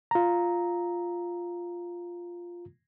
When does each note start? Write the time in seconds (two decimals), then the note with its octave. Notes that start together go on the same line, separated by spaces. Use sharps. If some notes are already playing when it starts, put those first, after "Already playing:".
0.11 F4 A#5